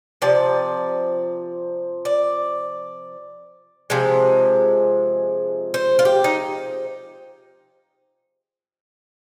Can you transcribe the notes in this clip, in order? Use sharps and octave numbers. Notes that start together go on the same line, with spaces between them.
C3 F3 D5
D5
C3 F3 G#3
C5
F4
G4
D#4